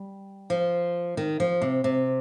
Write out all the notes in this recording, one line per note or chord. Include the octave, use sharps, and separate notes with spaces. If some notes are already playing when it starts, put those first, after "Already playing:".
Already playing: G3
F3
D#3
F3
C3
C3